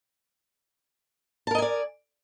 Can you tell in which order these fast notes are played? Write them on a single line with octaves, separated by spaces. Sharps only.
A5 A#4 D#5 G#5 D5